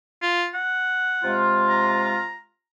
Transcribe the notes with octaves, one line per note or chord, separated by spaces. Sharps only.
F4
F#5
C3 G#3 F4
A#5